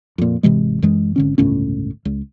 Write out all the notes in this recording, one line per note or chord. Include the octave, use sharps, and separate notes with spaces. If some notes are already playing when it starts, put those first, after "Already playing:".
F2 A#2
G#1 C3 E3 G#3
F#2 E3 G#3
G#1 D3 C#4
G1 C#2 A2 C#4
C#2